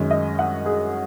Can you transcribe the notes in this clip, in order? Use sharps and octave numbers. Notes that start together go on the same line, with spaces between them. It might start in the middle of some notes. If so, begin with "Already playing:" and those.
Already playing: F#2 D#3 G#3 C#4
D#5
F#5
G#4